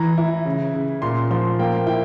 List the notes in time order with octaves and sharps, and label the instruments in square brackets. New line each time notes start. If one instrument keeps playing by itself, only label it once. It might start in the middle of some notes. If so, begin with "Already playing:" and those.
Already playing: [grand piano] E3 A#5
E4
C#3
C#3
A#2 C6
F3 C6
A#3 G5
E4 G5